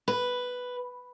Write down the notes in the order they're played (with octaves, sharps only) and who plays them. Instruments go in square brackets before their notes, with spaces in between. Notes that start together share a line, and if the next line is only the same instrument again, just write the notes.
[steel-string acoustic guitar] B4